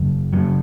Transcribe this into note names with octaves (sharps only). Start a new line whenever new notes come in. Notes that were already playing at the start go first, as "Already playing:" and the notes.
Already playing: F#1 F#2 C#3
F#1 F#2 C#3 F#3